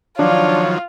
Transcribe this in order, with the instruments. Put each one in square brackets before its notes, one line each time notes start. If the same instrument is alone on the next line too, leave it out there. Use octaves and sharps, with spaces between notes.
[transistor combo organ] D#3 F3 F#3 [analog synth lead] D4 [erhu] F4 [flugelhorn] C#5